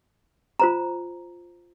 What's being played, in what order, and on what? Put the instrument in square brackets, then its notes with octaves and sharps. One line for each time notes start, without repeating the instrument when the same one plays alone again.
[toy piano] F4 C5 A#5